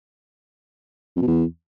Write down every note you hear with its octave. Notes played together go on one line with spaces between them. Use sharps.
F2
B2
E2